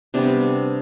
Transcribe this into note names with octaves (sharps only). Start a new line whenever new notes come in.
C3 G3 B3 D4